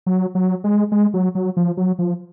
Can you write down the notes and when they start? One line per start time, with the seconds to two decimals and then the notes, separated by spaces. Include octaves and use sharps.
0.06 F#3
0.35 F#3
0.64 G#3
0.92 G#3
1.14 F#3
1.35 F#3
1.57 F3
1.77 F#3
1.99 F3